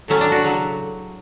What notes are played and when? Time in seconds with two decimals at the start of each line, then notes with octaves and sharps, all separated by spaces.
0.08 A2 F#3 A3 C#4
0.21 D4
0.32 F#4
0.43 C#3 F#3 A3